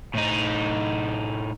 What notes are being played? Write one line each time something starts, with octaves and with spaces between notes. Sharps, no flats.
A2 D#4